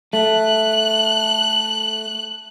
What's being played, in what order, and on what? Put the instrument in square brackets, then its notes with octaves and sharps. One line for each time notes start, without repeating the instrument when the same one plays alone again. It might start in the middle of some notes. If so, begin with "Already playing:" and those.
[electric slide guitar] A3 [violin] F#6